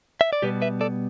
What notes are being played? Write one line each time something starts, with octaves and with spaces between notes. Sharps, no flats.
E5
D5
B2 G3 B3 G4 B4
B4 E5
A4 D5